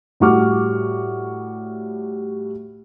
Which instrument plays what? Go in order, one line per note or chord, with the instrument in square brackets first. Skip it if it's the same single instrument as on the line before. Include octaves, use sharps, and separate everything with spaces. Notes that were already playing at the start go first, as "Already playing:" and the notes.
[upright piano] A2 G3 F#4 C#6 D6 F6